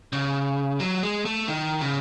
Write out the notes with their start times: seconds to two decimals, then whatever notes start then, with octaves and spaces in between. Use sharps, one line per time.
0.13 C#3
0.80 F#3
1.03 G#3
1.25 A3
1.48 D#3
1.81 C#3